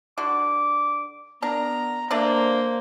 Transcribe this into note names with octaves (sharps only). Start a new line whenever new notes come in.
D3 F#4 D6
B3 D4 A#4 A#5
A3 A#3 D4 C5 D5 A#5